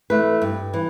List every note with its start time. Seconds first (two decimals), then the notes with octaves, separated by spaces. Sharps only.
0.10 E3 A3 B4
0.42 G2
0.74 E3